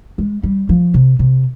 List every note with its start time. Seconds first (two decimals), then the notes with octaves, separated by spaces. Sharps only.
0.18 G#3
0.43 G3
0.69 F3
0.94 C3
1.19 C3